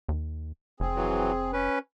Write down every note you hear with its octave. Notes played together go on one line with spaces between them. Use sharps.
D#2
F1 C4 G#4
E3 F#3
C#4 B4